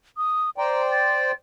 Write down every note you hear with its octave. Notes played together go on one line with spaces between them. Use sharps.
D#6
C5 D5 G5 A#5
A6